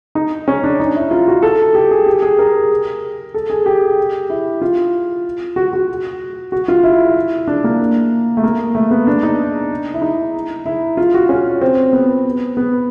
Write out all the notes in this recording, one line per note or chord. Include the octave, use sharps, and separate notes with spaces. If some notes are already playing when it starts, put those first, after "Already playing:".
D#4
C#4
D4
D#4
E4
F4
F#4
A4
G4
G#4
G4
G#4
A#4
A4
G#4
G4
E4
F4
F#4
F#4
F#4
F4
E4
D4
A#3
A3
A#3
A3
B3
D4
D#4
E4
D#4
E4
F4
F#4
C#4
C4
B3
B3